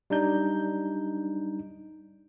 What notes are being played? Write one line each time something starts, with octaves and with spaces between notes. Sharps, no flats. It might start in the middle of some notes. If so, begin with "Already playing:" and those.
G3 D4 D#4 G6